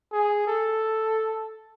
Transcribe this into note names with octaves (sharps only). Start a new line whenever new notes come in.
G#4
A4